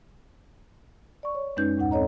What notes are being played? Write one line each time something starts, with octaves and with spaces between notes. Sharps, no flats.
D5 C#6
C#5
F#2 G#3 C#4 D#4 B4 G6
D#2 A2 D#4 F#5
C4 A4 C#5 D#5 A#5